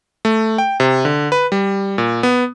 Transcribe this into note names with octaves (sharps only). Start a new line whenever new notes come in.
A3
G5
C3
D3
B4
G3
A#2
B3